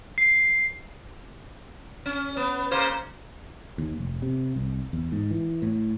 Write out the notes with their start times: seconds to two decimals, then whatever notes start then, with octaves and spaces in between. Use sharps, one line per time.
0.18 C7
2.06 C#4
2.37 B3
2.71 C#3 A#3 C5
3.78 D#2
3.98 F1
4.22 C3
4.56 C2
4.93 E2
5.12 G#2
5.31 E3
5.62 A2